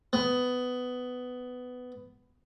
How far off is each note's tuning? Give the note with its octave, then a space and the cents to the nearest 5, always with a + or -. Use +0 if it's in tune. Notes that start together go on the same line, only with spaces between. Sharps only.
B3 +15